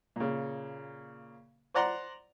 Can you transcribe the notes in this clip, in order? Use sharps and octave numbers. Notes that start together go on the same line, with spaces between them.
A#2 C#3
C5 D5 F#5 A#5 C6